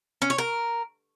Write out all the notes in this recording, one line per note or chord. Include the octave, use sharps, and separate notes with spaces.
C#4
C#5
A#4